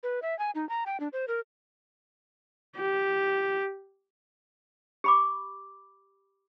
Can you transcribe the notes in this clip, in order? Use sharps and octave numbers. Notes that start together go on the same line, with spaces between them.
B4
E5
G#5
D#4
A#5
G5
D4
C5
A#4
G4
G4 B5 D6